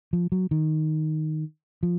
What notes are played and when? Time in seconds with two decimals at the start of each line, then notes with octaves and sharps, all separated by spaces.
0.13 F3
0.32 F#3
0.51 D#3
1.83 F3